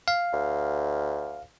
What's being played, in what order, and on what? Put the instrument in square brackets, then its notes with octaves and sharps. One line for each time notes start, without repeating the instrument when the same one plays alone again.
[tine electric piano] F5
[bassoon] D2